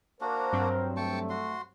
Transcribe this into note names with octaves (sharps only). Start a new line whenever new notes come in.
A#3 D4 F#4 A#4 C5
G2 F#3 C4
A3 G5 A5 C#6
F#4 C6